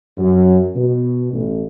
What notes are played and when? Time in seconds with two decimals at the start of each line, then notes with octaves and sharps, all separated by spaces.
0.18 F#2
0.76 B2
1.33 A1